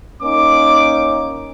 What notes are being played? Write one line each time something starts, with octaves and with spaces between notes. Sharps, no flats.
A#3 C#4 D#4 D6